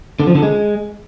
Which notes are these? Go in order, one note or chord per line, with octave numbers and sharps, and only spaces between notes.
D3
F3
D3
G#3